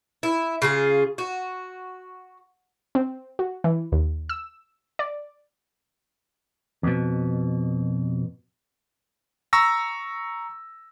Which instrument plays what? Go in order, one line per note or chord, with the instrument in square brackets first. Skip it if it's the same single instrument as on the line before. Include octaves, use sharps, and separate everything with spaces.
[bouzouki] E4
C#3 F4 G#4
F#4
[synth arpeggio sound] C4
F#4
E3
D#2
E6
D5
[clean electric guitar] F2 B2
[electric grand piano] A#5 C#6 E6 A#6